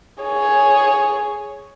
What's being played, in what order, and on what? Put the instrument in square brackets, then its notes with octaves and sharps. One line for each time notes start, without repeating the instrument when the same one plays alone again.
[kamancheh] G#4 C#5